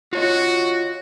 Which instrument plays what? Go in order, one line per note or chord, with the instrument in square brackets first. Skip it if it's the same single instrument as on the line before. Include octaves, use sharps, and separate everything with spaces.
[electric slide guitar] F4 C#5 D#5 [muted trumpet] F#4